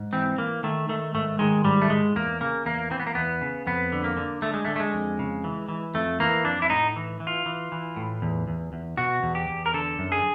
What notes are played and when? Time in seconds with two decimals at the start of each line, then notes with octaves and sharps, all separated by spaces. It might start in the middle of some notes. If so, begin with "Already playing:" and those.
Already playing: G#2
0.13 E3 C4
0.38 E3 A#3
0.63 D#3 A3
0.89 D#3 A3
1.14 G#2 A3
1.39 D#3 G#3
1.65 G#2 G3
1.82 A3
1.89 G#2 G#3
2.16 E2 A#3
2.41 C#3 A#3
2.65 E2 A#3
2.90 E3 C4
3.00 B3
3.07 A#3
3.15 E2 B3
3.41 C#3
3.67 F2 B3
3.92 D3
4.04 A#3
4.17 D3
4.42 D3 A3
4.54 G#3
4.65 A3
4.67 D3
4.76 A3
4.80 G#3
4.94 F2
5.19 C#3
5.44 E3
5.68 E3
5.94 F2 A3
6.20 E3 A#3
6.45 F2 D4
6.62 E4
6.70 A2 D#4
6.96 E3
7.20 E3
7.27 F4
7.46 E3
7.72 E3
7.97 A2
8.22 E2
8.48 E2
8.73 E2
8.97 B2 F#4
9.23 E2
9.35 G4
9.49 E2
9.66 A#4
9.74 D3 A4
9.99 F#2
10.12 G#4